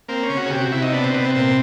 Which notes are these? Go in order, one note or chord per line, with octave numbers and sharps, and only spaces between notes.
A#3 C4
C#4
C#3
F#4
G#4
C3 G4
F#4
C3 E4
D#4
B3 D4
C4
C3 B3
C4
A#2 C4